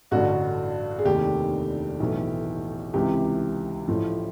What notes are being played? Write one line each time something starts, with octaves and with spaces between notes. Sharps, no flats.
A1 G2 D3 F#4
G#4
F1 D#2 D#3 G4
B1 A2 E3
C#2 C3 E3 G4
A1 A2 F3